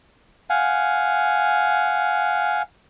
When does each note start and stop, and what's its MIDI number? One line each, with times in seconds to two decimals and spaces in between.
0.50 2.62 77
0.50 2.62 78
0.50 2.62 80